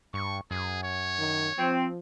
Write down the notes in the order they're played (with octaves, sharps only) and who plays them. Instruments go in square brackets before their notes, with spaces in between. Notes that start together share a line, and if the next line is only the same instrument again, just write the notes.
[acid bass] G2 [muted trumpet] C#6
[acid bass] F#2 [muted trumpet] G#4
[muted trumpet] C#5
[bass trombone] D#3
[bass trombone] F3 [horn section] C4